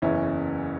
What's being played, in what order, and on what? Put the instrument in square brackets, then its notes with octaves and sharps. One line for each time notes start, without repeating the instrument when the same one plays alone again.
[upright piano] F#1 E2 E3 C#4 E4